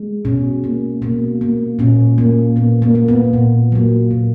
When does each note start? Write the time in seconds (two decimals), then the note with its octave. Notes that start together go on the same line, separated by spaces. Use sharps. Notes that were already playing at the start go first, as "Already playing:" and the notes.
Already playing: G#3
0.25 B2 C#4
0.64 A#3
1.02 B2 A#3
1.41 A#3
1.79 A#2 C#4
2.18 A#3
2.56 A#2 B3
2.82 A#3
2.95 A#3
3.08 B3
3.33 A#2
3.72 F#3 A#3
4.11 A#2